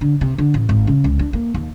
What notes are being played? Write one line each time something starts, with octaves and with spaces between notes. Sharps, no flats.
D3
C3
D3
A1
G#1
C#3
C#2
D4
A#3
D#2